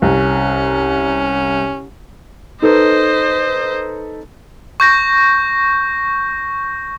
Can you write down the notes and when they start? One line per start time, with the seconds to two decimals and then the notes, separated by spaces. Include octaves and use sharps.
0.02 C2 C#4
2.62 D#4 A4 B4 C5 D#5
4.80 C#6 G6 A#6